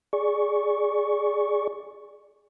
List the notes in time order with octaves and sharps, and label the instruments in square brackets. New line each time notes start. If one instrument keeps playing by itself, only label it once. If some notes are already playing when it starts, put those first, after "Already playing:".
[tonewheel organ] G#4 D5 C#6